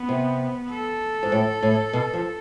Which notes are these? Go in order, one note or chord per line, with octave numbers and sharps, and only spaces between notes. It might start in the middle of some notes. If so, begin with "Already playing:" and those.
Already playing: B3
C3
A4
G#2
A2
A2
B2
F3